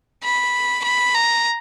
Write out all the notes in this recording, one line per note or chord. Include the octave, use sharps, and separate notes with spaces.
B5
B5
A#5